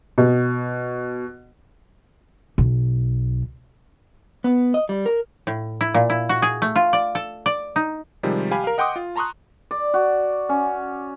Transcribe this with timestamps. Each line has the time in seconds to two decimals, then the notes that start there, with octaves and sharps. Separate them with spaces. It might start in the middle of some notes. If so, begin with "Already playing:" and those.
0.18 B2
2.58 B1
4.44 B3
4.74 D#5
4.89 G3
5.06 A#4
5.47 A2
5.81 E4
5.94 A#2
6.10 E4
6.29 F#4
6.42 G#4
6.62 A3
6.76 F4
6.93 D5
7.15 A4
7.46 D5
7.76 D#4
8.23 C3 D#3 F3 G3 G#3
8.51 G4 F5 G#5 B5
8.64 A#4 F5
8.78 D#5 F#5 G5 C6 D6 D#6
8.96 F4
9.16 A5 A#5 C6 C#6 D#6 F#6
9.71 D5
9.94 F#4
10.49 C#4